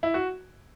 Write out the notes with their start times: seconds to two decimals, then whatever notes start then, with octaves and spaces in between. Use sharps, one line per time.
0.03 E4
0.14 F#4